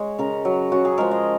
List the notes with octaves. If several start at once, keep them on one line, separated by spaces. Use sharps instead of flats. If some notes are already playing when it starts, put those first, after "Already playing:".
Already playing: G#3 C#5
C#3 A#4
F#3
C#3 F#4
G#4
F3 G#3 A#4
D#5